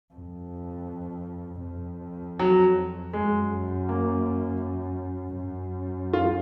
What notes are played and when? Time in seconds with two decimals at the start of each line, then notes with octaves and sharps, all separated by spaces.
0.14 F2
1.65 F2
2.40 F#3
3.13 F#2 G#3
3.89 A#3
5.38 F#2
6.13 F4